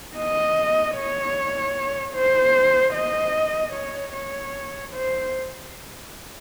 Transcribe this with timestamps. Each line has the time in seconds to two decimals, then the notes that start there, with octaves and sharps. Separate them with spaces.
0.17 D#5
0.96 C#5
2.15 C5
2.94 D#5
3.74 C#5
4.13 C#5
4.93 C5